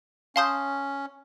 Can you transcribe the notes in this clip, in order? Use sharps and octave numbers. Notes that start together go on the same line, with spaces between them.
C#4 F5 A5 C6 D#6 G6